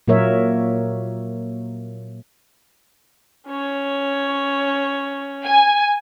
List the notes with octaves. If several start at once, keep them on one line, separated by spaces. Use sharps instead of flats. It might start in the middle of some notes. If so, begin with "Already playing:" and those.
A#2 F#3 A#3 A#4 C#5 E5
C#4 C#5
G#5